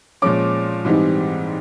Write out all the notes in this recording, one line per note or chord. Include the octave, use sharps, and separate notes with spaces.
A#2 F3 G#3 C#4 D6
G#2 E3 G3 C4 D#4